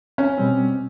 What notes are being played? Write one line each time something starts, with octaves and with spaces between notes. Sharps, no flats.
C#4
B2 G3 C4